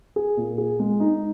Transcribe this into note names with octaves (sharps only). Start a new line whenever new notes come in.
G#4
A#2
G#4
G#3
D#4